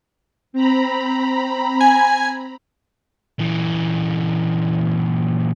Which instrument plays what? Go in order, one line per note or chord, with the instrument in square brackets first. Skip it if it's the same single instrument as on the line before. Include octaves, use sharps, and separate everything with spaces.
[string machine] C4 A#5 B5
[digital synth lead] G#5
[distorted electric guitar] A#2 E3